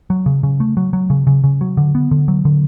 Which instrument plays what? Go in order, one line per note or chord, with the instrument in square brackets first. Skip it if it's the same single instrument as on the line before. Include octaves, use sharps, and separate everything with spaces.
[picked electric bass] F#3
C#3
C#3
A3
F#3
F#3
C#3
C#3
C#3
F#3
D3
B3
D3
F#3
D3